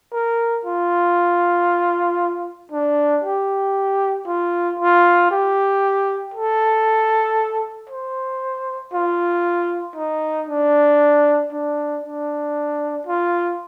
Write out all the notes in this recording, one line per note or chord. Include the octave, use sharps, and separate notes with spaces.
A#4
F4
D4
G4
F4
F4
G4
A4
C5
F4
D#4
D4
D4
D4
F4